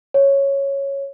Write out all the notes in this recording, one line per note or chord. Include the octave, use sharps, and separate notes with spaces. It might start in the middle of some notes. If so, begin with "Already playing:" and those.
C#5